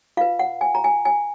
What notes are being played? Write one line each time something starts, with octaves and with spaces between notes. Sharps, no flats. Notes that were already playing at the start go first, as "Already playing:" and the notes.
F4 B4 F5
F#5
G#5
A#5
G#5
G#5